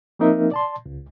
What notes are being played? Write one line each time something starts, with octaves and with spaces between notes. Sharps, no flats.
F3 A#3 C4 D#4 A#4 E5
D5 A5 C6
C#2